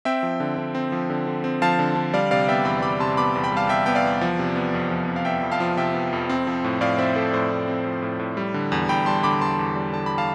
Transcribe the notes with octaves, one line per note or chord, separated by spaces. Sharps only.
C4 E5 G5
F3
D3
D3
C4
F3
D3
D3
C4
F3 F5 A5
D3
D3
G3 D5 F5
C3 D5 F5
B3 E5 G5
E2 G5 B5
G3 B5 D6
C3 A5 C6
B3 B5 D6
E2
G5 B5
G3 F5 A5
C3 E5 G5
B3 G5
D5 F5
E2
F3
C3
B3
F2
F3
C3
F5
B3 E5 G5
F2
F5 A5
F3
C3 E5 G5
B3
F2
C4
F3
A2
A2 D5 F5
C4 C5 E5
F3 A4 C5
A2 A4 C5
A2
C4
F3
A2
A2
G3
D3
E2
E2 G5 B5
G3 A5 C6
D3 B5 D6
E2 A5 C6
E2
G3
D3 A5
B5
F5 A5